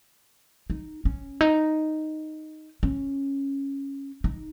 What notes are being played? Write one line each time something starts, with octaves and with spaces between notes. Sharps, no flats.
D#4
C#4
D#4
C#4
D#4